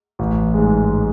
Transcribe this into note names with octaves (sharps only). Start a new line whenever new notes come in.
A1
G#2 G#3